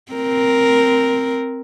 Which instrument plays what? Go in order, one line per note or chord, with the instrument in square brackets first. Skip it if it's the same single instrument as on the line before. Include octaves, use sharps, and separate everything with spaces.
[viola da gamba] C4 A#4